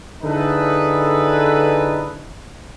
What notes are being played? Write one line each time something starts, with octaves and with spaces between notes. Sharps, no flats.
D3 D#4 E4 G#4 A4 B4